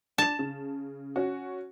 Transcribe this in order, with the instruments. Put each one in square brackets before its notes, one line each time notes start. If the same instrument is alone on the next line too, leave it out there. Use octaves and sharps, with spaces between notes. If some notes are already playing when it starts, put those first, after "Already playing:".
[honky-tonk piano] D4 E7 [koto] A5
[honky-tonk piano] C#3
C#4 F#4